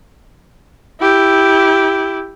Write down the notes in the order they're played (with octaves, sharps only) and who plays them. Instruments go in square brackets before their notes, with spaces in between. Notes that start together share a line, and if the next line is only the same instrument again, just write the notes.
[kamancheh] E4 G4